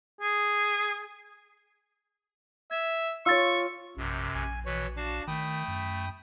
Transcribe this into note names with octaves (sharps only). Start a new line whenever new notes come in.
G#4
E5 G#6
F4 C#5 C#6 E6 A6
A#1 F#2 C3
A#1 G#5
B2 E3 C#5
D4 F#4 F5 A5
D#3 A3 G5 B5 D#6
F#2